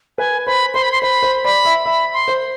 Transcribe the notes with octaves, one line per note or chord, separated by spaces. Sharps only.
B4 G#5
C5 B5
C5 C6
B5
C6
C5 B5
C5
D5 B5
E5
E5 B5
C6
C5